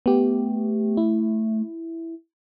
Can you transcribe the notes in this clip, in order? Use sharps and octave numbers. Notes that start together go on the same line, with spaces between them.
A3 B3 G4
E4